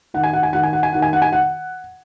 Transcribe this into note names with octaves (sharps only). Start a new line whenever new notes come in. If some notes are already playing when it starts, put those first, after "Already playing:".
D#3 F#5
G#5
F#5
G#5
D#3 F#5
G#5
F#5
G#5
D#3 F#5
G#5
F#5
G#5
F#5